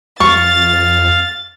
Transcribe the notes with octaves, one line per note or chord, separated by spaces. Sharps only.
F2 F5 C#6 A6